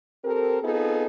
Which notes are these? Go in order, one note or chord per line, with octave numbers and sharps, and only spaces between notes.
C4 G4 A4 A#4
B3 C4 D#4 F4 G#4 A4